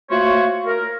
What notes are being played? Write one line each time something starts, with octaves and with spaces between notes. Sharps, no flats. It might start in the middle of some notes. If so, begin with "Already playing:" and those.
A3 A#3 F4 F#4 C5 C#5
A#4